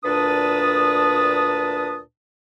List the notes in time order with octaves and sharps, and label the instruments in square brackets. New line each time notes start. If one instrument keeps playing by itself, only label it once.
[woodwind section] D2 A#2 D4 B4 A5 D#6